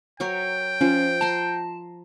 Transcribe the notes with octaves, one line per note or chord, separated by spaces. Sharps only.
F#3 A#4 C#5 G5
F3 C#4
A5 A#5 C6